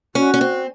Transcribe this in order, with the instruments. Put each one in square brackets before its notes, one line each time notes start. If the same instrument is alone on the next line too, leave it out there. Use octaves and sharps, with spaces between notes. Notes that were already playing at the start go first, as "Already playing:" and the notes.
[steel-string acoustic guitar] C#4 [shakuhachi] F#4
[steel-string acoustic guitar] C#4
C4